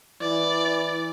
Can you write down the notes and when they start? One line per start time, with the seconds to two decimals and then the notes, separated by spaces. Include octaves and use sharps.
0.21 E3 D5